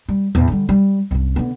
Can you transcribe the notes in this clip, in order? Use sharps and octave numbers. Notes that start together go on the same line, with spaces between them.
G3
E2 A2
D3 G3
G3
C2 F#2
D3 B3